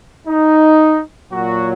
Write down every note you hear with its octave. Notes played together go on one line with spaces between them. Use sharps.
D#4
A#2 F#3 F#4